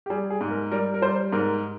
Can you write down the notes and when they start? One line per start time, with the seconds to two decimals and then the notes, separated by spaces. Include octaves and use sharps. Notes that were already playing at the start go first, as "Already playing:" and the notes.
0.06 G4
0.10 G3 G#4
0.30 G#4
0.41 G#2
0.51 A#4
0.72 G3 A#4
0.94 A#4
1.02 G3 C5
1.33 G#2 A#4